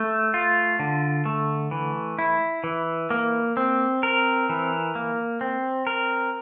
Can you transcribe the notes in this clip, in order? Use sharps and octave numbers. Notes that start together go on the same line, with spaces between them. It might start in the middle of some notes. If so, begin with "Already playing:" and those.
Already playing: A3
F4
D3
A3
E3
E4
E3
A#3
C4
A#4
E3
A#3
C4
A#4